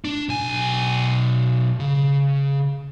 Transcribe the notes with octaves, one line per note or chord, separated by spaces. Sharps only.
D4
B1 G#5
C#3